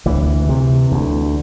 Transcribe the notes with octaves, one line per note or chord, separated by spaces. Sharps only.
D2 E3
C3
D2